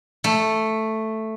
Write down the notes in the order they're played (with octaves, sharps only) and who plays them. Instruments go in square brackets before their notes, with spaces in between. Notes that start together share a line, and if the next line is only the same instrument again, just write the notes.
[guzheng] A3